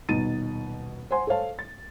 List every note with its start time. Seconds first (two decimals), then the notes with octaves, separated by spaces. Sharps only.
0.09 D#1 B2 D#4 A6 D#7
1.11 C5 F#5 G#5 C6
1.27 A4 C5 C#5 F5 A5
1.59 A6